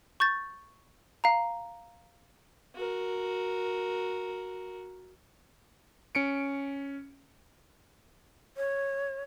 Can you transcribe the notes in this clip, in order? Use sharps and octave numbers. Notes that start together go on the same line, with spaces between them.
C#6 G6 A6
F5 A#5
F#4 A#4
C#4 C#7 D7
C#5